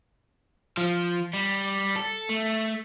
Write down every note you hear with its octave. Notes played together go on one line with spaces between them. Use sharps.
F3
G3
A4
A3